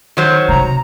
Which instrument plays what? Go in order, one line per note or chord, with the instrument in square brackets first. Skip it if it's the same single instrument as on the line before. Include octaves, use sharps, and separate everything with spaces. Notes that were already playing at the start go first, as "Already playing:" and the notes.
[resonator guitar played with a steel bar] D#3 F#3 C5
[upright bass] C3 [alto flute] A#5